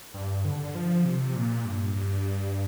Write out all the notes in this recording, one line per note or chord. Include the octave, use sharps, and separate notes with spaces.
G2
D3
F3
C3
A#2
G2
G2